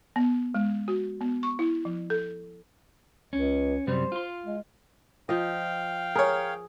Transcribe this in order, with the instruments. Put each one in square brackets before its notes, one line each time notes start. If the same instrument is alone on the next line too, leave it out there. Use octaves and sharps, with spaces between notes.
[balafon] B3
G#3
F#4
B3
C#6
E4
F3
A4
[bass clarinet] C#2 [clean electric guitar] C#4
[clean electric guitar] F#2 C3 G3 [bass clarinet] C5
[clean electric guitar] F4 C6
[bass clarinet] G#3
[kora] F3 D#5 [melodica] F5 G5
[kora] G#4 [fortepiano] A#4 C#5